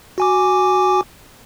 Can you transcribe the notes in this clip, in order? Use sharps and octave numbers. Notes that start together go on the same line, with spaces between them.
F#4 G#5 D6